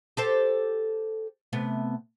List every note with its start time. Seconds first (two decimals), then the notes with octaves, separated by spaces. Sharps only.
0.17 G4 A4 C5
1.53 C3 A3 B3